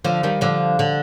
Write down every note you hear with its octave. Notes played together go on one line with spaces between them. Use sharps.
D3 F3
D#3 G3
D3 F3
D3